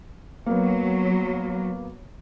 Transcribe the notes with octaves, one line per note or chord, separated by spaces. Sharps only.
F#3 A#3 B3